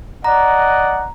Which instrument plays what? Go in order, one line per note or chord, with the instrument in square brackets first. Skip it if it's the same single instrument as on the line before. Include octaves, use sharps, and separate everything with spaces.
[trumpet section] D5 D#5 F#5 [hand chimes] A#5